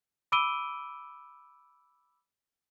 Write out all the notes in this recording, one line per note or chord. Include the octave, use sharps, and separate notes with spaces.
B5 D6 E6 D7 D#7 G7